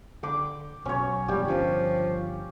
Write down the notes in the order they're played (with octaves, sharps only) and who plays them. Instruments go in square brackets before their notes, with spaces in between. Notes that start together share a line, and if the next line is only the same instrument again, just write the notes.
[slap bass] D3 [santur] G5 D6
[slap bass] B1 [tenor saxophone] F#3 [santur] C#4 C#5
[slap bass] E1 [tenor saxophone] G3 [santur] G4
[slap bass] G1 D#3 C#4 [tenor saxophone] F3